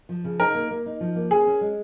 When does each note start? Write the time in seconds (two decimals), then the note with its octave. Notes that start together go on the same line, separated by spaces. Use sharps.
0.09 F3
0.24 C#3
0.39 D#4 A#4
0.54 A#3
0.71 A#3
0.86 D#4
1.01 F3
1.16 A#3
1.31 C#4 G#4
1.47 C#4
1.61 G#3